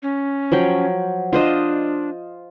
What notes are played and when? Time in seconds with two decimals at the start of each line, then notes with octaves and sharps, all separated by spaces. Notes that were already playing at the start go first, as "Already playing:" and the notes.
0.03 C#4
0.52 F3 F#3 G5
1.33 D4 F4 C5 D#5